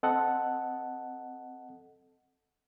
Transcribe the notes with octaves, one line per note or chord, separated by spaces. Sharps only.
C4 A4 D#5 F#5 A5